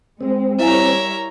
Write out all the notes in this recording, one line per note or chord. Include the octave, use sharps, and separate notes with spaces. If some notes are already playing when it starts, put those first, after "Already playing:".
G#3 C4
G3 E4 A#4 C#5 E5 F5 G#5 A#5